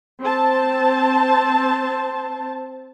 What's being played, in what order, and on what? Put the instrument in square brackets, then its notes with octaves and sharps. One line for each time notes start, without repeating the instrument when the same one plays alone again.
[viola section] C4 C5 A5